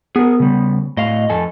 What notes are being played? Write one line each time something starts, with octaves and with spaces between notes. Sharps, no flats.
B3 G#4 A#4
C#3 G3
A2 D#5 F5
F2 A4 G#5